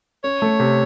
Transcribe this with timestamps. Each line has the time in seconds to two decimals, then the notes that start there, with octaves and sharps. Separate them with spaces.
0.24 C#4 C#5
0.42 A3
0.59 C3